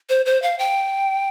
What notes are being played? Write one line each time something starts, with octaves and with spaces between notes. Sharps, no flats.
C5
C5
F5
G5